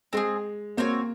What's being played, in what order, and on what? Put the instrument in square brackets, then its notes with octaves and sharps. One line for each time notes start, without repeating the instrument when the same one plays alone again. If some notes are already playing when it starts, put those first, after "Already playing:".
[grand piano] G#3 [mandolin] C4 F4 G#4
[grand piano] A#3 [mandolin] C4 F#4 C#5